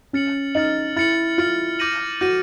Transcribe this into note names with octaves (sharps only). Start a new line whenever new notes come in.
C#4 F6 A6 C#7 F#7
D#4 F6 A6 C#7 F#7
E4 F6 A6 C#7 F#7
F4 F6 A6 C#7 F#7
D6 G6 A#6 D#7 F#7
F#4 D6 G6 A#6 D#7 F#7